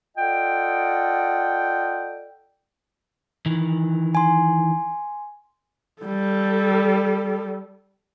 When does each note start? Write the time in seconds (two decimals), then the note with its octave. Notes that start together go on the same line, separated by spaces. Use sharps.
0.17 F4 A4 D5 D#5 F#5 G5
3.46 D#3 E3
4.15 G#5 C6
6.02 G3 A4